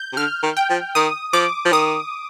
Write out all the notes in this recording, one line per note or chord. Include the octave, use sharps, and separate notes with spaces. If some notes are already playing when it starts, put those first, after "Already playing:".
Already playing: G6
C3
D3 F6
D#3
G5
F3
D#3 D#6
F3 D6
F3
D#3 D#6